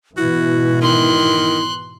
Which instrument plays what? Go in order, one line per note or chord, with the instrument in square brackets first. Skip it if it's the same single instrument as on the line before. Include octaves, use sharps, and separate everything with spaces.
[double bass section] G#2 B2 E3 [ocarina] E4 [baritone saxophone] F#4
[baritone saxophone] D#3 [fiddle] C6 F#6